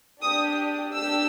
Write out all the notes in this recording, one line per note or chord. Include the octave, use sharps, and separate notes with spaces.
D4 G4 D#6
D4 G4 E6